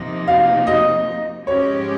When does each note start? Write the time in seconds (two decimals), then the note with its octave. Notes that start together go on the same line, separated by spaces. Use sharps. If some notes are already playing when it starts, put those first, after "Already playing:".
Already playing: C3 F3 A#3 D#4
0.28 F5
0.67 D#5
1.47 G#2 F3 G#3 C#4 G4 C#5